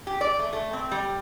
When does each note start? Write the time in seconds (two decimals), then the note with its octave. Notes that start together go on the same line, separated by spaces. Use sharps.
0.07 G4
0.21 D5
0.39 A3
0.53 A3
0.73 C4
0.91 G3